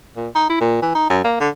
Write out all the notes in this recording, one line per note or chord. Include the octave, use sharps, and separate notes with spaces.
A#2
D#4
E4
A#2
E3
D#4
F#2
A#3
D3